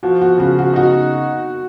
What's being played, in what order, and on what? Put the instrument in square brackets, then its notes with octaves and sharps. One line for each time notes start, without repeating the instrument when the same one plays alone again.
[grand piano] F3 [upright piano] F#4
[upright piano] F#4
[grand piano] C#3 [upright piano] F#4
[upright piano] F#4
[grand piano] D#4 [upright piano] F#4